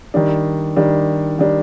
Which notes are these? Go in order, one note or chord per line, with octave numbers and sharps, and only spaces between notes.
D#3 G3 D4
D#3 G3 D4
D#3 G3 D4